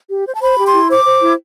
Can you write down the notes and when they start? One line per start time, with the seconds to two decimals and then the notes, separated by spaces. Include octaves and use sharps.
0.10 G4
0.26 C5
0.35 A5
0.42 C5 B5
0.58 G4
0.66 C6
0.73 E4
0.89 C5 D6
1.05 C5
1.22 E4